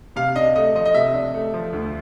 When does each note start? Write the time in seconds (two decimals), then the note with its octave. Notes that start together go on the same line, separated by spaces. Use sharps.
0.16 C3 F5
0.36 D4 D#5
0.55 A3 D#5
0.75 F3 D#5
0.85 D#5
0.94 C3 E5
1.14 D4
1.34 A3
1.54 F3
1.73 D2